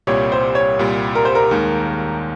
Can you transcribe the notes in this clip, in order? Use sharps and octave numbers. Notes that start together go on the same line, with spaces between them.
C2 A#2 G3 C#5
C5
C#5
C2 A#2 G3
A#4
C5
A#4
D#2 D#3 G#3